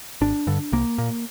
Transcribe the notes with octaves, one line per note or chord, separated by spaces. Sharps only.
G#1 D4
G2 D3
C2 A#3
A#2